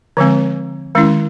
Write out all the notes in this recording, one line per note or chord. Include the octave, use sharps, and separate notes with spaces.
D3 F3 G#3 C4
D#3 G#3 C#4 E4